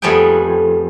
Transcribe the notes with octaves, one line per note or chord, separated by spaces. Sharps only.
F2 G3 A3 B3 G#4 G5